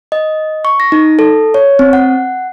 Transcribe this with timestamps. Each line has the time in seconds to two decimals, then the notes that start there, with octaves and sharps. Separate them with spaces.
0.12 D#5
0.65 C#6
0.80 A#6
0.92 D#4
1.19 A4
1.54 C#5
1.79 C4
1.93 F#5